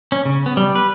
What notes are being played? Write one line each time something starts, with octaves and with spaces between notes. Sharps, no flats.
C#4
C#3
B3
G3
B4